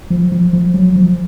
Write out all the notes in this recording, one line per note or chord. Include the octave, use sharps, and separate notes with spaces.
F3
F3
F3
F#3
F3